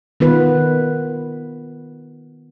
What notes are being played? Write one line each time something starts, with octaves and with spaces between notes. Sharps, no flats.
D#3 B3 F4 B4